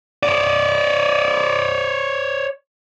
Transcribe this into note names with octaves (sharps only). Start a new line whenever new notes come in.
C#5 D5